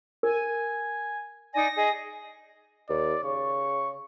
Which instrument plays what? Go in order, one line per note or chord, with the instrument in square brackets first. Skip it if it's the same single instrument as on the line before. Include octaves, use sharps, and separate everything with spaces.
[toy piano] A#4 [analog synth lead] G#5
[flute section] D#4 D5 G#5 [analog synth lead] A#6
[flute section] G#4 D#5
[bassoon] D#2 [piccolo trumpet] D5
[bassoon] C#3 [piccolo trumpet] C#6